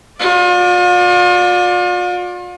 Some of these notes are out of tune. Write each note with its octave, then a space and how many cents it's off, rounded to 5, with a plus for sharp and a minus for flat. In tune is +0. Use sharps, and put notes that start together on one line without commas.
F4 +40 D5 +0